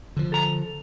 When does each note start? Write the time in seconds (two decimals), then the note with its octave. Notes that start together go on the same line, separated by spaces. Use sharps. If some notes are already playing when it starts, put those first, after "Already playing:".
0.17 D3 F3
0.32 A4 A#5